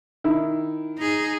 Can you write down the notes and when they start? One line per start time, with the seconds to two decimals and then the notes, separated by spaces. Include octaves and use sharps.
0.24 D#3 E4
0.98 D#4 G#4